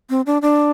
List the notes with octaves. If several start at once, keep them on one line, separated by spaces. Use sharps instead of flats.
C4
D4
D4